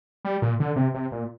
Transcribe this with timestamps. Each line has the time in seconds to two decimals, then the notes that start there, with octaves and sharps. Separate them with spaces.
0.25 G3
0.42 A#2
0.60 D3
0.76 C3
0.94 C3
1.12 A#2